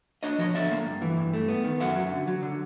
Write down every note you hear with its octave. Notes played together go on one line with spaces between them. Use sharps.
D4 C#5 D#5
F3 C#5 D#5
D3 D5 E5
A#3
G2
E3
G2
A3
B3
D#3
F#2 E5 F#5
F#3
D3
F#3
D3